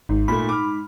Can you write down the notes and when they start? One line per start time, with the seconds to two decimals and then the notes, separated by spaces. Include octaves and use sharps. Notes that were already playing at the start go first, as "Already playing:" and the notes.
0.09 G#1 G#2
0.28 A#2 A3 B5
0.49 D6 F6